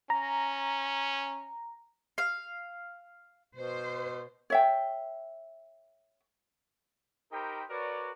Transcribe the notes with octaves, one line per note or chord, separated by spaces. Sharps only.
C#4 A#5
F5
B2 C5
C#5 E5 G5
D#4 G4 A#4 C5 G5 B5
F#4 A#4 B4 C#5 D5